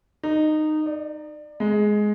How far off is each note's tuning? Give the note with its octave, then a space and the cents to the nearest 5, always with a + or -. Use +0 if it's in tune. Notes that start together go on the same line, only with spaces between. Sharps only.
D#4 -15
D5 +25
G#3 +10